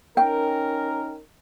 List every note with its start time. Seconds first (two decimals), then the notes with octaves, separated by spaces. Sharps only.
0.17 C#4 D#4 A#4 G5